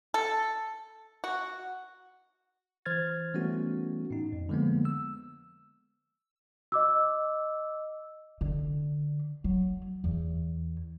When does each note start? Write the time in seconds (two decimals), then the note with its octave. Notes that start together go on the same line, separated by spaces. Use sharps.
0.14 A4
1.24 F#4
2.86 E3 C5 F6 G#6 A6
3.34 E3 G3 A3 B3 C#4 F#4
4.11 A2 D#4
4.33 F2
4.49 D3 F3 G#3 A#3 B3
4.85 E6
6.72 D#5 D6 E6
8.41 D3
9.44 F#3
10.04 E2